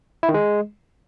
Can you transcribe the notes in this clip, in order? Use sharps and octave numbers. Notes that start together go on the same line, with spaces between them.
E4
D#3
G#3